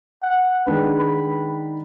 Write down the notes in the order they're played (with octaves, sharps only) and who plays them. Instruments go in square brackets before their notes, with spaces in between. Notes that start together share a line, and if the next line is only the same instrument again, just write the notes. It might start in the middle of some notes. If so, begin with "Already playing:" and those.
[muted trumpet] F#5
[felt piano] D#3 G#3 D4 [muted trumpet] B4
[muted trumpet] B5